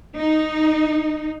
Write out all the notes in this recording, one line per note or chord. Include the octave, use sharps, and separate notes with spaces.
D#4